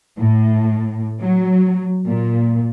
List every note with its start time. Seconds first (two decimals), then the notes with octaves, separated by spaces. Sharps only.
0.19 A2
1.22 F#3
2.06 A#2